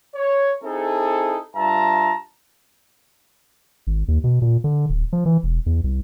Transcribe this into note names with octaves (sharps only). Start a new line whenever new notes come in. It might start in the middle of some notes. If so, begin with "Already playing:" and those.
C#5
C4 D#4 E4 G#4 A4
G2 F4 E5 A5 A#5
G#1
D#2
B2
A#2
D3
D1
F3
E3
E1
E2
C2